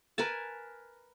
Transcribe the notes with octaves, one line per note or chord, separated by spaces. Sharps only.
A#4 B4 G#5 A5